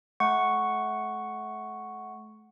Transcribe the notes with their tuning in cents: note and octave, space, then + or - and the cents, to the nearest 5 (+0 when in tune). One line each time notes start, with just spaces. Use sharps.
A3 -35 F#5 +0 C#6 +0